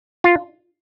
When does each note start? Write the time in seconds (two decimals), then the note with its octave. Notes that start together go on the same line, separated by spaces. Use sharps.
0.24 F4